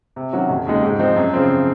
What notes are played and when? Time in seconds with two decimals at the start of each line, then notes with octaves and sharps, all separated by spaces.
0.16 C3
0.33 D#3 F#3 C#4 F#4
0.50 F1
0.67 D#2 C#3 G#3 D#4
0.83 G#2
0.99 F3 C4 D#4
1.16 F#2
1.33 C#3 F3 C4